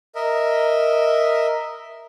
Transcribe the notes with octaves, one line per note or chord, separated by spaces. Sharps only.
A#4 D#5 E5